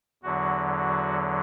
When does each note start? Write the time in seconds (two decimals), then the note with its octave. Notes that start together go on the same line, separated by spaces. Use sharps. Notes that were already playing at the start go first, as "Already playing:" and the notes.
0.23 E2 D3 F#3 F#4
0.78 F#4